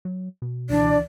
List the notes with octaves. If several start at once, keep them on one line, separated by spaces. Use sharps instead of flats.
F#3
B2
C#2 E3 D4 D5